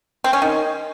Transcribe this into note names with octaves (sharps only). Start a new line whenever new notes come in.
C4
C#4
D#3